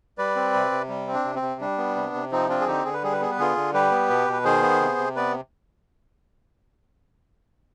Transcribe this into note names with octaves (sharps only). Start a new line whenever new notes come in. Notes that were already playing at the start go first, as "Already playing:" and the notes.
G3 B4 D5
C4
C3
C3
G3
C4
D4
C3
C4
C3
G3 D4
B3
C3
C3
F3 C4 D#4
C4 D4 F4
G#4
D3 D#4 G4
D3 G#4
B4
G3 G#4
B4
B3 G#4
B4
D3 F4 G#4
D3
G3 G4 B4
B3
B2
B2 B4
D#3 G#4 C5
B3
C3
C3
B3 B4 D5